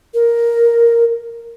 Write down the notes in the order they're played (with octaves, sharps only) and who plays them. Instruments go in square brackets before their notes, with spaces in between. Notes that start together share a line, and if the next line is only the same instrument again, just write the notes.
[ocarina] A#4